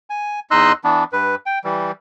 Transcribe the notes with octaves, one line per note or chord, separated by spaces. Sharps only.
G#5
E2 D#4 D#5 C6 E6 F#6
E3 B3 D4
G2 B4
G5
E3 G3